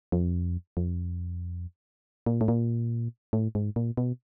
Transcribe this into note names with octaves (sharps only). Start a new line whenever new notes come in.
F2
F2
A#2
A2
A#2
A2
G#2
A#2
B2